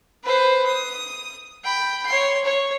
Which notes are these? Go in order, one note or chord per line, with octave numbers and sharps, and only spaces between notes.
B4 C5
D#6
G5 B5
C#5 C6
C#5